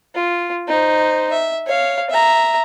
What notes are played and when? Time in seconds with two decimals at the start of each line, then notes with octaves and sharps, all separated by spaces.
0.15 F4
0.68 D#4 C5
1.32 E5
1.67 C#5 F5
2.10 E5 A#5